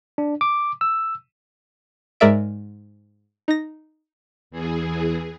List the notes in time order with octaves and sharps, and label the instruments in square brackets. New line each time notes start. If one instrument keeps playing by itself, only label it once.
[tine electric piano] D4
D6
E6
[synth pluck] G#2 G#3 A#4 D5 E5 D7
D#4 A#6
[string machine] E2 E3 G#4